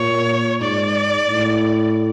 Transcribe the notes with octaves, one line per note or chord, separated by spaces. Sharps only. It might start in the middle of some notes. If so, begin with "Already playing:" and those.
Already playing: A#2 C#5
G#2 D5
A2